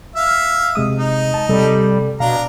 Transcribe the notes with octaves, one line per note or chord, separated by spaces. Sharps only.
E5 F5
C3 G#3 D#6
D#4
A5
C3 G3 A4
B2 D4 F5 A#5